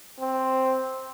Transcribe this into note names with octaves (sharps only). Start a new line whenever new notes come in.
C4